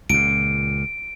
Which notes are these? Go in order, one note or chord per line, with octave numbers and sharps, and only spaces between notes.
C#2 A#2 D7